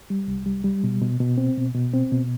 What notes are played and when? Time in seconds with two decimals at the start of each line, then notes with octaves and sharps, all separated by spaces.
0.10 G3
0.28 C2
0.46 G3
0.64 G3
0.84 B2
1.01 B2
1.20 B2
1.38 C4
1.57 B2
1.74 B2
1.93 C4
2.12 B2